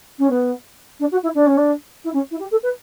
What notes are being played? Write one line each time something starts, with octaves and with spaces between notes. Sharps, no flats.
C#4
B3
D4
F#4
E4
D4
C#4
D4
E4
C#4
E4
G4
A4
B4